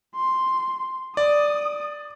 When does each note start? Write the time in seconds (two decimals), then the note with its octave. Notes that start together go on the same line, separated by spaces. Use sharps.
0.16 C6
1.17 D5 D#6